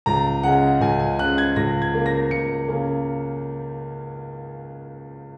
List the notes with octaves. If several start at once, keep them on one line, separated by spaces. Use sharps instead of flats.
C#2 A#5
C#3 G#3 F#5
C#2 G#5
G#5
C#3 G#3 F#6
G#6
C#2 A#6
G#6
C#3 A#3
A#6
C#2 C#7
C#3 A#3